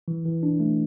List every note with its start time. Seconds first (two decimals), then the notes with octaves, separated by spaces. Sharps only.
0.08 E3
0.25 E3
0.43 D4
0.60 A3